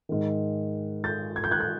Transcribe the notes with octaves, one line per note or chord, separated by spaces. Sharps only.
G#2 D#3
G6 A6
G#6
G6
F#6 G#6
G6